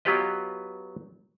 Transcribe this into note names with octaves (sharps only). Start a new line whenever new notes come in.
F#3 B3 F4 G4 B4 D#5